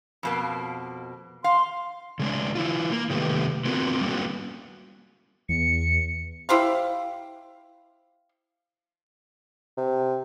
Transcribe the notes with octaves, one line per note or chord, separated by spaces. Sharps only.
F2 B2 A#3
F5 C6
C#3 G#3 D4
E3 E4 F4
A#3
C3 D#3 G3 A3 B3 G4
B3 C4 F4 F#4 A#4
G3 A#3 B3 C#4 F#4
E2 C#7
E4 G4 C5 F5
C3